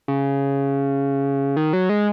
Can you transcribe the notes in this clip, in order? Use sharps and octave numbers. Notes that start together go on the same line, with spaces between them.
C#3
D#3
F#3
G#3